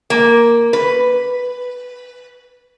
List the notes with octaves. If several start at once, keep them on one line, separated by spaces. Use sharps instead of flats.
A#3
B4